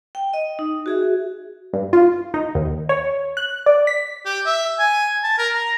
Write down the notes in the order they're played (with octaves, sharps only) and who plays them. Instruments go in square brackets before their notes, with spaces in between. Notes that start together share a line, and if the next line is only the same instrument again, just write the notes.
[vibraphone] G5
D#5
D#4
F#4 G#4 E5
[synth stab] G2
F4
D#4
D#2
C#5
F#6
D5
B6
[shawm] G4
E5
G#5
A5
A#4
A#5